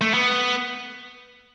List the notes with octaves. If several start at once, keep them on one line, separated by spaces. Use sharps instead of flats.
A3
B3